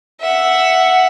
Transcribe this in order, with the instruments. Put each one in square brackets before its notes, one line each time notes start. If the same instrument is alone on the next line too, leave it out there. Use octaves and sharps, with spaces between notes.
[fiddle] E5 F#5